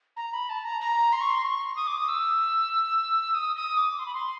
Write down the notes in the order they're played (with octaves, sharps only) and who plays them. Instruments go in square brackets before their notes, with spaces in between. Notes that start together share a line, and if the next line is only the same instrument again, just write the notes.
[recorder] A#5
B5
A5
A#5
A#5
C6
C#6
C6
C#6
D#6
D6
D#6
E6
D#6
D#6
D6
C6
B5
C6